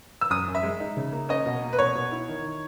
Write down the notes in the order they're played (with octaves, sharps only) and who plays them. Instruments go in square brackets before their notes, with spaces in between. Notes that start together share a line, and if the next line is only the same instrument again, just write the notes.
[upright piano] E6
F#2 D#6
F#2
E5
G#3
D#4
C#3
A#3
C#4 D#5
B2
A#3
B4
B2 C#5
B2
E4
D#3
D#3